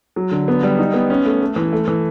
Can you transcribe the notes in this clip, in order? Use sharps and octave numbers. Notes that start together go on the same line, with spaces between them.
F#3
D3
B3
G3
D#4
B3
C#4
A3
A3
E3
A3
E3